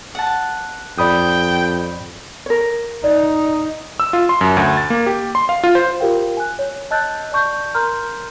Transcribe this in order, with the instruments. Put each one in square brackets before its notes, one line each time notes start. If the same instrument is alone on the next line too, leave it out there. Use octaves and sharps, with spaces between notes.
[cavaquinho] F#5 A5
[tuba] F2 [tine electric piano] D5 B5 D#6 [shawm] G5
[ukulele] A#4 C#5
[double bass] D#4 [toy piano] D5
[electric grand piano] E6
F4
C6
F#2
D2
A6
A#3
G4
C6
F5
F4
C5
[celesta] F4 G4 A#4 C5 F5 G5
G#5 F#6
C#5
D#5 A5 E6 F#6 G6 A6
D5 A5 C#6 G6
A#4 A#5 C6 F6 G6